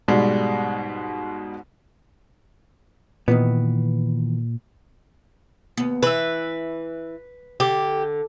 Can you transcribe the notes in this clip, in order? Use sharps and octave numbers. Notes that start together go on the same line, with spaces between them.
G#2 B2 G3 G#3
A#2 D#3 E3 B3
D#2 B3
E3 B4 E5
D3 G4